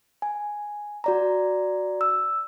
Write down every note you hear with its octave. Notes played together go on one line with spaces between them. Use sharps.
G#5
F#4 D5 A#5
E6